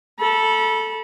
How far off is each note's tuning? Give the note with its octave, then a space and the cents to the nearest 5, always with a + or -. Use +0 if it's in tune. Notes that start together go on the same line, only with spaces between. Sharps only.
A4 +0 B5 -35